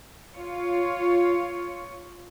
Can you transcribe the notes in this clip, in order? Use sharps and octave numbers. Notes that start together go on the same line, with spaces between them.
F4 C#5